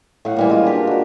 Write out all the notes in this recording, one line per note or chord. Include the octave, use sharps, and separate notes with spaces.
A2 F5 F#5
E3 G3 A#3
G#3 F4
D4 G4 A#4
F#4 A#4